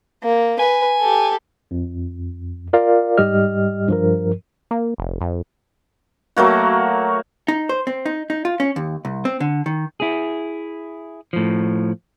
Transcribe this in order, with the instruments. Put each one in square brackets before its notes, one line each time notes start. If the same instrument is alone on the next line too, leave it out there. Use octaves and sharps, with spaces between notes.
[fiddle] A#3
[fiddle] B4 [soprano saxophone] G#5
[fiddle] G4 A4
[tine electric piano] F2
F4 A#4 D5 F5
G#2 G3 G4 D#5 F6
G2 F3 A#4
[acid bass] A#3
F1
F2
[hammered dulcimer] F#3 A3 A#3 F#4
[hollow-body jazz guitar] D#4
C5
C4
D#4
D#4
F4
C#4
D#2
C2
C4
D3
D#3
[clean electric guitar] E4 G#4
A2 F3